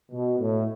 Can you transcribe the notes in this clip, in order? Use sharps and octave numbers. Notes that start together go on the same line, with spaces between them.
B2
A2